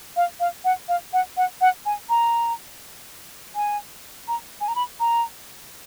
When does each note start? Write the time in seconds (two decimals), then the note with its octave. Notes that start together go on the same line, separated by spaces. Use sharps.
0.16 F5
0.40 F5
0.65 F#5
0.89 F5
1.13 F#5
1.37 F#5
1.61 F#5
1.86 G#5
2.09 A#5
3.55 G#5
4.28 A#5
4.61 G#5
4.68 A#5
4.76 B5
5.00 A#5